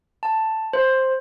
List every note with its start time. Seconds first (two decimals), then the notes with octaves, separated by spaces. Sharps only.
0.23 A5
0.73 C5